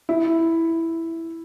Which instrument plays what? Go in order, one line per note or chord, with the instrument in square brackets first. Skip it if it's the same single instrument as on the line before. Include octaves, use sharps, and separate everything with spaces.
[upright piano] E4